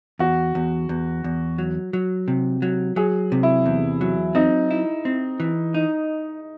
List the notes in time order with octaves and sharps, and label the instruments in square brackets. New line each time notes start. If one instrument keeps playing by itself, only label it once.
[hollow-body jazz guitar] E2 [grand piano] F#4
[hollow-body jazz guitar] E2
E2
E2
F#3
F#3
C3
F#3
[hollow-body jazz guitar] F#3 [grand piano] G#4
[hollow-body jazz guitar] C3
[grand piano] E4
[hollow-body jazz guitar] E2
F#3
[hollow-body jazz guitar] C4 [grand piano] D#4
[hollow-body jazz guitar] E4
C4
E3
D#4